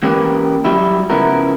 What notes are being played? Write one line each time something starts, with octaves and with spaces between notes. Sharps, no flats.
E3 A#3 C#4 G4 A#4 B4
F#3 G3 E4
C#3 F3 B3 E4 A#4